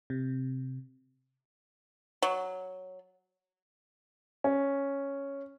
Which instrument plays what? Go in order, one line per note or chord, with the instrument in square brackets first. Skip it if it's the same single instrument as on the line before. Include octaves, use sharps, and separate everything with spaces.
[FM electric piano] C3
[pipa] F#3
[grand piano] C#4